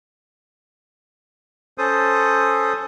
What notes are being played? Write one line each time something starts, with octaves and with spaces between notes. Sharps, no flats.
C#4 A4 C5 D#6